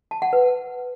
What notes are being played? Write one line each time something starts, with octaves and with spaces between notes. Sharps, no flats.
A5
F#5
B4